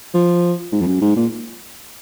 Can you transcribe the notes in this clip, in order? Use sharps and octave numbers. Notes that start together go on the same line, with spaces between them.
F3
G#2
F2
F#2
G#2
A#2